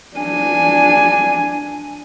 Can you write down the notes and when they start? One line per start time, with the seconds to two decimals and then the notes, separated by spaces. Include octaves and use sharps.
0.18 D4 G#5